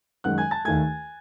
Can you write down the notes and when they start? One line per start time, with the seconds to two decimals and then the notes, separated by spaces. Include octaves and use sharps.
0.24 F#2 D#3 G#3 F#5 F#6
0.38 G#5 G#6
0.51 A5 A6
0.65 D#2 D#3 A3 G#5 G#6